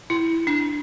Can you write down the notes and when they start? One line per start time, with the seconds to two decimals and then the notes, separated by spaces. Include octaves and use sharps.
0.10 E4
0.47 D4